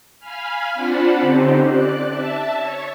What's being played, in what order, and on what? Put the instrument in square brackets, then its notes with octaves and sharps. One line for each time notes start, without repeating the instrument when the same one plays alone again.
[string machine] F5 G#5 B5 F6
C4 D4 F4 F#5 A5 B5
D3 C4 C#4 D#4 G4 C5
D5 F#6
E5 A5
C#5